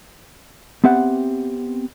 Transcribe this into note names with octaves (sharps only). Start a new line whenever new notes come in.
B3 C4 G4 E5 F#5